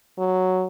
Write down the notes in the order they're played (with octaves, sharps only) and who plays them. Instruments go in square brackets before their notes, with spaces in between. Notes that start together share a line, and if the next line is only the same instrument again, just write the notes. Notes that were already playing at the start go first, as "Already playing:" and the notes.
[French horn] F#3